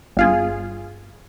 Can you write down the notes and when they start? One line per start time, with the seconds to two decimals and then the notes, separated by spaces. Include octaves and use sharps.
0.17 G1 F4 G#4